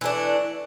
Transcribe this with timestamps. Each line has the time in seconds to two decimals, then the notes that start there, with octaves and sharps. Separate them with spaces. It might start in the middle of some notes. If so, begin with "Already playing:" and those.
0.01 E3 A3 D4